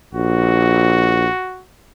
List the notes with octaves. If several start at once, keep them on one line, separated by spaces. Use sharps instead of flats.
A#1 F#4